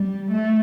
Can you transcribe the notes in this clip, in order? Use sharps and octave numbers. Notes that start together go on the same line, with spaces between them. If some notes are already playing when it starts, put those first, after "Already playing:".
Already playing: G3
A3